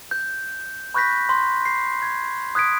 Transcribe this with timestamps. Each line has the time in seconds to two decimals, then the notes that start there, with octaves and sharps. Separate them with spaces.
0.11 G6
0.94 B5 C#6 F#6 G6 A#6 B6
1.29 C6
1.65 C7
2.02 G#6
2.55 D#6 F#6 G#6 B6 D7